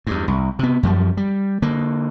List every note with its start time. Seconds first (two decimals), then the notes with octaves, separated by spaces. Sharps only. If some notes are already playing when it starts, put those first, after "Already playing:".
0.07 E2 G2
0.28 C2
0.59 C3 B3
0.83 F#2 F3 G3
1.17 G3
1.62 D3 A#3